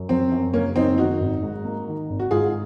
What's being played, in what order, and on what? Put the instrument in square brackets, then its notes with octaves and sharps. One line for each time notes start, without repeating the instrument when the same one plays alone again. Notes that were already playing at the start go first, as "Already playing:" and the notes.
Already playing: [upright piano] F#2
[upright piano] F#3 [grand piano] C4
[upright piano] F#2
[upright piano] C#3 [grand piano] A#3 C#4
[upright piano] F#2 [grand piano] C4 D#4
[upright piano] D#3 [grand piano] D#4 F#4
[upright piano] G#1
G#2
A#3
D#3
G#1
[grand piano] F#4
[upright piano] G#2 [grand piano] F4 G#4